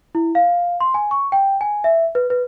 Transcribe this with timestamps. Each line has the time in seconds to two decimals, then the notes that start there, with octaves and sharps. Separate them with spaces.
0.15 E4
0.35 F5
0.80 C6
0.94 G#5
1.11 C#6
1.32 G5
1.61 G#5
1.84 E5
2.15 B4
2.30 B4